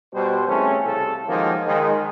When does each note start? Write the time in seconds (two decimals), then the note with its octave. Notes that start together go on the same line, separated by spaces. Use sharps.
0.14 B2 G3 C5
0.47 C#3 E3 A3 C4 C#4
0.86 C2 C#3 A4
1.28 D#3 F3 F#3 G#3 A#3
1.67 D#3 G#3